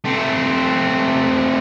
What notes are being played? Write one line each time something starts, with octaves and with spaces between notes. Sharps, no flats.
A3 C4